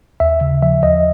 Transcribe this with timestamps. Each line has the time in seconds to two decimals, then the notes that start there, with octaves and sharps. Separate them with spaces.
0.20 D#2 E5
0.41 C#3
0.62 F3 E5
0.83 D#2 D#5